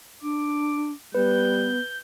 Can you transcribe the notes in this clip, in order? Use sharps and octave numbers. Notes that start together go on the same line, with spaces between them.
D4 D6
G3 B3 B4 G6